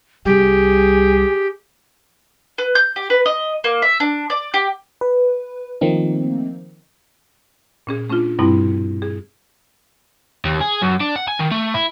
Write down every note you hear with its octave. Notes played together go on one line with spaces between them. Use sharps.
C2 G3 G4 G#4
B4
G6
G4
B4
D#5
A#3
E5
D4
D5
G4
B4
D#3 F3 A3 A#3 C4 D#4
A#2 C#4 G#4
A3 C#4 D4 F4
G2 B2 G3 A3 C4 E4
G#4
D#2
G#4
F#2
D4
F#5
G#5
D#3
A3
E4